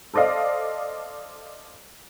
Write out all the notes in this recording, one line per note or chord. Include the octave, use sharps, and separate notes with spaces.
A4 C5 D5 D#5 F5